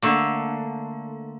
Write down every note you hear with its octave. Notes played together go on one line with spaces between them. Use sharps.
D3 A3 A#3